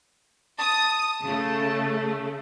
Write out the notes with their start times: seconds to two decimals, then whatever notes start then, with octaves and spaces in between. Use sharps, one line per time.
0.59 A5 D#6
1.24 C#3 A3